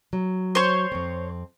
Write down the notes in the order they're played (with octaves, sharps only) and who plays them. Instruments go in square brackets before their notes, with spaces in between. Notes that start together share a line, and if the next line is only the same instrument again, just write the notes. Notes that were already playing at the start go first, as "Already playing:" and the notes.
[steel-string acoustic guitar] F#3
[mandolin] C5 C#5
[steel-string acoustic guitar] F2 C4